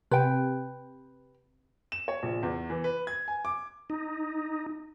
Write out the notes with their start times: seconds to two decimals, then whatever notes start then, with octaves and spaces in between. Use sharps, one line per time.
0.11 C3 B4 G5
1.92 E7
2.08 C#5
2.23 A#1
2.43 E2
2.70 E3
2.84 B4
3.07 G#6
3.28 G#5
3.45 D6
3.90 D#4